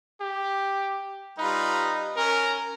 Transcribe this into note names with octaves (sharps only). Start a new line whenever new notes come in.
G4
G3 D#4 F4 B4
C#4 A#4